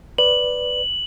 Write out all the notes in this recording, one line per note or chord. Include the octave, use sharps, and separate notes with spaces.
B4 D5 F#7